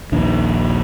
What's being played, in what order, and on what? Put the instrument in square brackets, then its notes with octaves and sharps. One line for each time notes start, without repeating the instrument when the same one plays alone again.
[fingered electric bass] A#1 D#2 D4